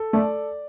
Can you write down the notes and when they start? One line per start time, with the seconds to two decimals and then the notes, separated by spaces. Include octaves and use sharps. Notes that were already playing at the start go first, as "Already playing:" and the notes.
Already playing: A4
0.13 A3 D5